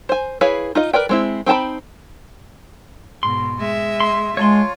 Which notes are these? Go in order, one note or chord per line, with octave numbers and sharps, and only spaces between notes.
C5 G#5
E4 G#4 B4 C#5 F5
D#4 F4 D#5
A#4 B4 D5 G5
G#3 C4 E4
C4 D#4 G5 A5 B5
G#2 B2 C6
G#3 E5
C6
G#3 F4 C#5 A5 C6